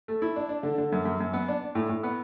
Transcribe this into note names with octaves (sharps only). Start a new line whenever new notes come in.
A3
E4
D4
D4
D3
D3
F#2
F#2
F#2
B3
D4
D4
A2
A2
B3